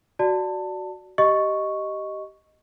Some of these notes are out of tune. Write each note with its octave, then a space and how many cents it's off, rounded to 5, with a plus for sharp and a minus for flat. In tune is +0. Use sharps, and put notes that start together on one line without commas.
F#4 +10 D5 +0 A5 +20
G4 -15 D#5 +0 C#6 +0